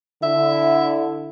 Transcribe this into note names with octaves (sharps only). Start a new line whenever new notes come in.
D3 E4 E5